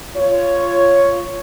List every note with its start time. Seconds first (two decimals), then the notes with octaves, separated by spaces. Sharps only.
0.15 F4 C#5